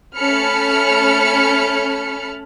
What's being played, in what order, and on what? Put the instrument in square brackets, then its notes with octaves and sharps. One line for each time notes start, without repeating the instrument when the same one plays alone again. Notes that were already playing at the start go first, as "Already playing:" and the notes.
[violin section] A3 C#4 A5 B5 F6 C#7